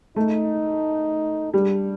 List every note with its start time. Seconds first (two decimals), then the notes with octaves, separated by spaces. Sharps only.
0.16 A3 D#4
1.54 G3 D4